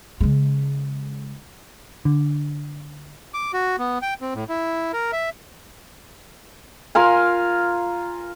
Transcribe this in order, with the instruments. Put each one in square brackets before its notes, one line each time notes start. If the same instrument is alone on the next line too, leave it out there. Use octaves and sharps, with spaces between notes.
[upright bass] C#3 G#3
[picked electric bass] D3
[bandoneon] D6
F#4
B3
G5
C4
A2
E4
A#4
E5
[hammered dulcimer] F4 A#4 F5 G#5